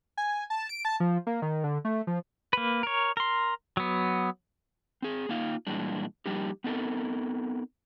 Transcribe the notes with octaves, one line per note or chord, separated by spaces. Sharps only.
G#5
A5
D7
A5
F3
A#3
D#3
D3
A3
F3
A#3 B4
A#4 C#5
A#4 C6
F#3 B3
C4 G#4
A#3 D#4 F4 F5
A#2 E3 G3 G#3 D4
F3 G3 A#3 D4 D#4 G4
B3 C4 D#4 A4 A#4